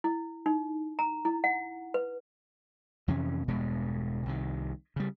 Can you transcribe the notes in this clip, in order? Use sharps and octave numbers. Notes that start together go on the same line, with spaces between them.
E4
D#4
A#5
E4
F#5
B4
F2 C3 E3 C#4
E1 G2 B2 G#3
C2 C3 D#3
C#3 G3